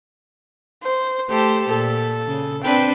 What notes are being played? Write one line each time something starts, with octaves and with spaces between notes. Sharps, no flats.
C5
A3 G4 A4 C5
A#2 A4
C#3
C4 D4 B4 G5